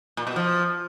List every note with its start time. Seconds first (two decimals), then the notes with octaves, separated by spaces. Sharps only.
0.17 A#2
0.27 B2
0.36 F3